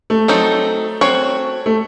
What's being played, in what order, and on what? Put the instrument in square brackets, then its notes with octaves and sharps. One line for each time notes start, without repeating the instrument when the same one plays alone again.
[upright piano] A3
[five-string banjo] F#3 C4 D#4 A4
C4 F#4 C#5
[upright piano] A3